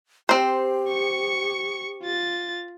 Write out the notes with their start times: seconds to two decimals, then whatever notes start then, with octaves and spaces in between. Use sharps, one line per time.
0.29 C4 G4 C5
0.88 C#6 C#7
2.03 F4 A6